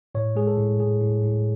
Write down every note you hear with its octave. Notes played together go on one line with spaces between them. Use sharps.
A2 C#5
G#3 G#4
A4
A2
A2 G#4
A2
A2